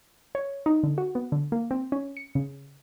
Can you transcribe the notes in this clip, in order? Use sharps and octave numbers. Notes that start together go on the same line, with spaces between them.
C#5
D#4
D3
F#4
B3
D3
A#3
C4
C#4
C#7
C#3